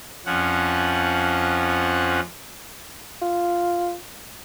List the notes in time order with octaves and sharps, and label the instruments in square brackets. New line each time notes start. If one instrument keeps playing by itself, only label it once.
[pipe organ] F2 F3 C#4 F#5
[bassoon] F4